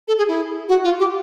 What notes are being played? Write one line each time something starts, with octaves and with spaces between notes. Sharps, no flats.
A4
G#4
E4
F#4
F4
G4